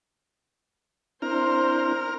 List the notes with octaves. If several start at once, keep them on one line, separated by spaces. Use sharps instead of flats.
C4 D4 E4 A#4 C5 F6